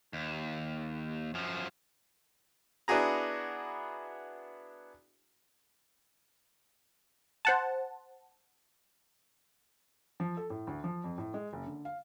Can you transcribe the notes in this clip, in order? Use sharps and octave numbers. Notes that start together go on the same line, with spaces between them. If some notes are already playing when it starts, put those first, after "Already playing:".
D#2
F#2 F3
B3 D4 E4 F#4 G#4 A#5
C5 F#5 A5
F3
A4
A2
D2
F3
F2
A2
G#3
F#1
D3
F5